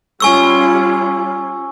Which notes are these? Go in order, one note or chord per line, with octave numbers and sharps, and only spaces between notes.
G3 C#4 F4 G#5 C#6 E6